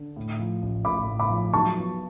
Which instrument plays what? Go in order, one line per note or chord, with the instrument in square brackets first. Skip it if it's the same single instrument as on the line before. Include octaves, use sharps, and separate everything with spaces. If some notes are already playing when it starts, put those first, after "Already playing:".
Already playing: [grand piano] D3
A2
F3
A1
[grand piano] A1 [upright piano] B5 D6
[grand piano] A2
[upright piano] B5 D6
[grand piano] F3
[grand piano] F#3 [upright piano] A5 C#6
[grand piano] B3